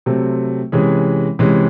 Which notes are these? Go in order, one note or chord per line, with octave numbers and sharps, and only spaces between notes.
C3 F#3 A3 C4
C3 E3 G#3 C#4 G#4
C3 E3 G#3 C#4